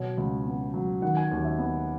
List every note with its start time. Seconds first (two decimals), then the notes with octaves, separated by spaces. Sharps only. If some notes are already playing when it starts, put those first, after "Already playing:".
Already playing: B2 F#3 C#5
0.17 C#2
0.47 B3
0.74 F#3
1.02 D#3 F#5
1.17 G#5
1.32 D#2
1.45 E5
1.59 B3